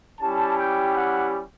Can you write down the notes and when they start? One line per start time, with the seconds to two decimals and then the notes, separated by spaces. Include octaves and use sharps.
0.19 G3 C#4 E4 G4 A5
0.57 G5
0.95 F#5